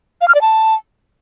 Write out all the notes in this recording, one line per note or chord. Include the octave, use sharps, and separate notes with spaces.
F5
F6
D5
A5